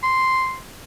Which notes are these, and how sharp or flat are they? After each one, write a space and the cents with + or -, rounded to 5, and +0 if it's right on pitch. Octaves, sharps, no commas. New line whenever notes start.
C6 -5